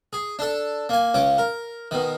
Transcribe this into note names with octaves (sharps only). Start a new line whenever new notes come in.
G#4
D4 A4
A#3 G#5
C#2 C#4 D6
A#4
B2 D#3